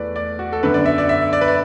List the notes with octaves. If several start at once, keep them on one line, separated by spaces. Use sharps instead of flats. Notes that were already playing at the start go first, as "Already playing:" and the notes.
Already playing: E2 E3 A3 B4 D5
D5
F#4
A4
F#2 D3 B3 B4
D5
E5
D5
E5
D5
B4
D5